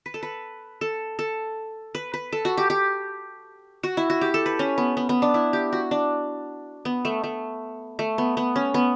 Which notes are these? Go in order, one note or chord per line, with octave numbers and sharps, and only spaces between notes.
B4
A4
B4
A4
A4
B4
B4
A4
F#4
G4
G4
F#4
E4
F#4
G4
A4
B4
C#4
B3
B3
B3
D4
E4
G4
F#4
D4
B3
A3
A3
A3
B3
B3
C#4
B3